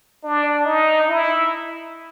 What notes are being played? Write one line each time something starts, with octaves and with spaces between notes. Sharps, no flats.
D4
D#4
E4